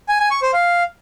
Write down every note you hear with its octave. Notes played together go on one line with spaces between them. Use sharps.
G#5
G#5
C#6
C5
F5